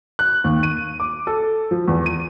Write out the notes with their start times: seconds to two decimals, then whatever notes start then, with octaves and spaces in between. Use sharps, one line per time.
0.19 F#6
0.44 D#2
0.63 D#7
1.00 D6
1.27 A4
1.71 F3
1.88 E2
2.06 D#7